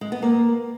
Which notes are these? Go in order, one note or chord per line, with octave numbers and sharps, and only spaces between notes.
G#3
B3
A#3